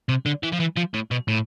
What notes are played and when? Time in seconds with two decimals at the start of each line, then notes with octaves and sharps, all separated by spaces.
0.09 C3
0.26 D3
0.43 E3
0.52 F3
0.60 E3
0.77 F3
0.94 A2
1.11 B2
1.28 A2